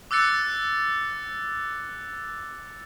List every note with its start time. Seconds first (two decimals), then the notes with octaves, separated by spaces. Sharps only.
0.11 D6 E6 F#6 A6 C#7